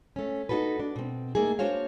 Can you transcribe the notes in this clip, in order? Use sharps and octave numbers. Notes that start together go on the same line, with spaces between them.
A3 C#4
D#4 F4 F#4 A4 B4
D4
B2 C4
A3 A#3 D#4 G#4
A#3 D4 F#4 C5 C#5 F5